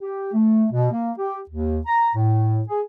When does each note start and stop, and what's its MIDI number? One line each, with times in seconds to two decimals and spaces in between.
0.01 0.31 67
0.33 0.65 57
0.72 0.91 47
0.92 1.11 58
1.18 1.40 67
1.50 1.79 39
1.86 2.10 82
2.15 2.62 45
2.68 2.81 68